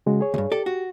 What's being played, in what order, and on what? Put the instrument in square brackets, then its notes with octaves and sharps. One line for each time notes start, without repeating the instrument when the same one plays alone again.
[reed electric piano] C#3 G#3 F#4
G#4 C#5
[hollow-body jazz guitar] D2 G2
[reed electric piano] G4 [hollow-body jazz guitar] A4 D5
[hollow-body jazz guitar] F#4